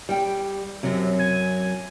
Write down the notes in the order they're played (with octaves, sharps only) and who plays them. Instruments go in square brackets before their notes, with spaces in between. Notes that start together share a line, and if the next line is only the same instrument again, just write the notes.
[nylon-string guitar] G3 G5
[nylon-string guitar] F#2 F#3 [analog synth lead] C3
[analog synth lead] G#5